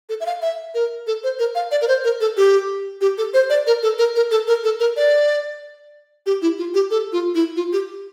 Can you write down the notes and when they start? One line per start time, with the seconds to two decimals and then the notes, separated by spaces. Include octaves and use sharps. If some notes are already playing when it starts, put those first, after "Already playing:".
0.09 A4
0.20 E5
0.26 F5
0.42 E5
0.74 A#4
1.07 A4
1.24 C5
1.39 A#4
1.55 F5
1.71 D5
1.81 A#4
1.88 C5
2.04 A#4
2.21 A4
2.37 G4
3.01 G4
3.18 A4
3.34 C5
3.50 D5
3.67 A#4
3.83 A4
3.98 A#4
4.16 A#4
4.31 A4
4.48 A#4
4.64 A4
4.80 A#4
4.97 D5
6.26 G4
6.42 E4
6.58 F4
6.74 G4
6.91 A4
7.12 F4
7.35 E4
7.56 F4
7.73 G4